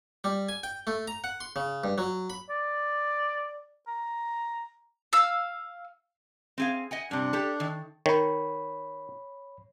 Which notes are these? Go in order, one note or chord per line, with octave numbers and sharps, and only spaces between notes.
G3
G#5
G5
A3
A#5
F#5
C6
C#3
G2
F#3
B5
D5
A#5
F5 E6
C4 G#4 F5
D#5 F#5 G#5
G2 C3 D4
G4 A4
D#3
D#3 C#5 B5